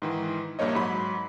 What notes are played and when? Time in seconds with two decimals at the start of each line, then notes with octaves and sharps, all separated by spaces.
0.02 G#2 D#3 E3
0.59 A#1 G2 A#3 D#4 C#5 D#5
0.75 G#2 F#3 B5